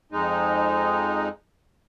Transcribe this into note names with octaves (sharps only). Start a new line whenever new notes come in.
F2 G#3 D#4